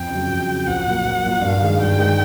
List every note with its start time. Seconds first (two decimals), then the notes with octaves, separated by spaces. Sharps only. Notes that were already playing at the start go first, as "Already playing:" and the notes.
Already playing: F2 G5
0.10 C#3 F#3
0.29 F2
0.48 C#3 F#3
0.67 A#1 F#5
0.85 A#2 F#3 A#3
1.05 A#1
1.23 A#2 F#3 A#3
1.42 G2 F5
1.61 D#3 G#3
1.79 G2 G5
1.98 D#3 G#3